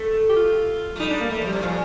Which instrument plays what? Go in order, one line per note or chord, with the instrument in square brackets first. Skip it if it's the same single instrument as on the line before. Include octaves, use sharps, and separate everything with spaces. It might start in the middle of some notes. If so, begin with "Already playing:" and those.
Already playing: [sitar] A3
[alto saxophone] G4
F4
[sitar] A3
[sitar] G3 [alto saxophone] D#4
[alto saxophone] D4
A#3
[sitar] G3 [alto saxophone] A3
[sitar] F3 [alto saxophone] G3
[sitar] C3
A2
[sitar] A#2 [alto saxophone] F3